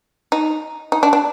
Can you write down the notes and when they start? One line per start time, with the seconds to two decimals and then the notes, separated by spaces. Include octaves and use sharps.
0.32 D#4
0.92 D#4
1.03 D4
1.13 D4